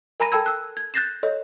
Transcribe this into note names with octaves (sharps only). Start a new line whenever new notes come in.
A#4 G#5 A#5 B5 A#6 D#7
A4 G5 A5 B5 E6 G#6
E6 F#6
G#6
F#6 G6 A6 A#6 C7 E7
A4 C#5 D#5